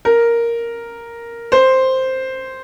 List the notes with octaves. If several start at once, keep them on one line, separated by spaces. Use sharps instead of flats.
A#4
C5